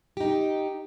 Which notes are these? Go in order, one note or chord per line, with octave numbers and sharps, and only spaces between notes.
D#4 G4